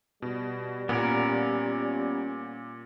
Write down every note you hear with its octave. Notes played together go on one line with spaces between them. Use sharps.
B2 G3
A#2 B3 C#4 A#4